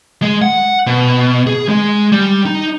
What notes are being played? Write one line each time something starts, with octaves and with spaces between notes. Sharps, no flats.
G#3
F#5
B2
G#4
G#3
G3
D#4